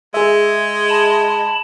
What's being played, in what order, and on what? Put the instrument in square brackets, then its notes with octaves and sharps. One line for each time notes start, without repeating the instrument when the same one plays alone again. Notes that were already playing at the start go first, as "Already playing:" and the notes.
[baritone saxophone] G#3 [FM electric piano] G#4 E5
[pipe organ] A5 B5